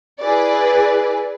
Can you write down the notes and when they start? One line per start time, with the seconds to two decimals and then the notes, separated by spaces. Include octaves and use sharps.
0.21 E4 G#4 B4 D5